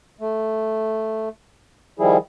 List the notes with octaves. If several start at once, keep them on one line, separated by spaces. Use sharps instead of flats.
A3
D#3 F3 G3 E4 G#4